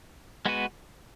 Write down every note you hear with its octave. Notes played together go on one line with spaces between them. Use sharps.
G#3 B3 F#4 B4